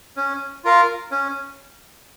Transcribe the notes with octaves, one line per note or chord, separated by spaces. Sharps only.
C#4
F4 A#4 F5
C#4